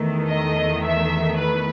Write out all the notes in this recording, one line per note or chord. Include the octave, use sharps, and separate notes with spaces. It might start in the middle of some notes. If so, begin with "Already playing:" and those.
Already playing: E2 D#3 A3
D#5
E5
B4